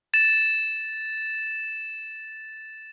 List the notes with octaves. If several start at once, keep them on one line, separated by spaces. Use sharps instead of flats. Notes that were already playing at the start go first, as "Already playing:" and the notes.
A6 E7